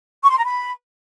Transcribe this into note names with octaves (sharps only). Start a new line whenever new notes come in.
C#6
C6
A#5
B5